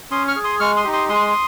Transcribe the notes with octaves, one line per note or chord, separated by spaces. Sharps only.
C#4 C6 D#6
C#6 F6
G#4
C6 D#6
G#3 C#6 F6
C6 D#6
D#4 G4
C6 D#6
G#3 C6 D#6